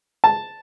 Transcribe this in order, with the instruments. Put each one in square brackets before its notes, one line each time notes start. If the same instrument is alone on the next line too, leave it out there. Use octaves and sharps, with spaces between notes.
[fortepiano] A5